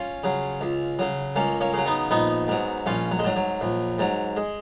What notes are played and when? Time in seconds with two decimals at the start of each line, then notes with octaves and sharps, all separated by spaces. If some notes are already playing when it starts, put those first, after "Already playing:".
Already playing: C#4 F4
0.24 C#3 F#3
0.61 C#2
0.99 C#3 F#3
1.36 C#2 A#3 C#4
1.61 A#3 C#4
1.73 C#3 F#3
1.86 B3 D#4
2.11 A#1 B3 D#4
2.48 G#2 F#3
2.86 A#1 C#4 F4
3.12 F#3
3.19 G#3
3.24 G#2 F#3
3.36 F#3
3.61 A#1
3.98 G#2 F#3
4.37 G#3